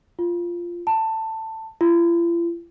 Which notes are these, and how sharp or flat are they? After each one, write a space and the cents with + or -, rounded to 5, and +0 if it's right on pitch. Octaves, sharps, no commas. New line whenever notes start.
F4 -10
A5 +15
F4 -45